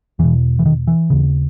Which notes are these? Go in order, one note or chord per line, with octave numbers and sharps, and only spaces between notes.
E2 B2 E3
E3
D#3
E3
D#2 C#3